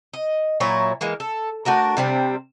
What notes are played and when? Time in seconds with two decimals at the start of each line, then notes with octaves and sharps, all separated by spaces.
0.14 D#5
0.60 A#2 F#3 E4 C#5
1.01 E3 G#3 A#3
1.20 A4
1.65 A3 D4 F#4 A#4
1.97 C3 G3 C4